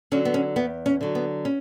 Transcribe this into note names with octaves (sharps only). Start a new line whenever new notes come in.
D3 F#3 C#4
B3
C#4
E2 B3
C#4
D3 F#3
B3
C#4